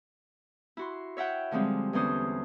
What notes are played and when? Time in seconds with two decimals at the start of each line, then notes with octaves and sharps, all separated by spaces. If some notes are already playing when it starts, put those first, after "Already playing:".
0.77 E4 F#4 C6
1.17 C#5 E5 F#5 G5
1.51 D3 F3 G3 G#3 C4
1.93 E2 D3 E3 C#4 C5 D#6